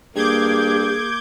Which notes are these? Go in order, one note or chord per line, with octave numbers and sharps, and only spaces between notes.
G2 A#3 G#4 D6 G6 G#6